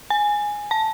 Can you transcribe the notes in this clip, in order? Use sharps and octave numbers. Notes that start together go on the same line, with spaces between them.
G#5
A5